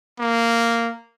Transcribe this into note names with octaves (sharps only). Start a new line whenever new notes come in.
A#3